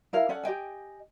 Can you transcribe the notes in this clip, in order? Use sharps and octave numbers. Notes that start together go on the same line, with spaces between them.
E4 A#4 F5
C#4 A4 D5 F#5
G4 D#5 G5 G#5